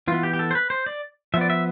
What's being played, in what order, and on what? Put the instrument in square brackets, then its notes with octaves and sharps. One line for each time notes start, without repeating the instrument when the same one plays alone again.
[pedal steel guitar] E3 B3 F4
G4
G4
A4
C5
B4
C5
D5
F3 E5
B3 D5
E5